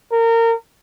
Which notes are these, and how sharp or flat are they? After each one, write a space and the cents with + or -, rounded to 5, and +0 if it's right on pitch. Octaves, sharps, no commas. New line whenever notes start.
A#4 -25